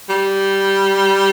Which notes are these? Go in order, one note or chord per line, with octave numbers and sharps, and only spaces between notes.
G3